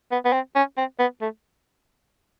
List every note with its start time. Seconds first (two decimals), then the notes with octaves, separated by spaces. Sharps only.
0.12 B3
0.25 B3
0.33 C4
0.56 C#4
0.77 C4
0.99 B3
1.21 A3